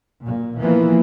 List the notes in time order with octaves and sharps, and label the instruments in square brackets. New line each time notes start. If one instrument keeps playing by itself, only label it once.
[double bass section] A#2
E3 F3 A#3 B3